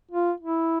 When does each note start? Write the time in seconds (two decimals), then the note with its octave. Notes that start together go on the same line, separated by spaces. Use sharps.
0.11 F4
0.40 E4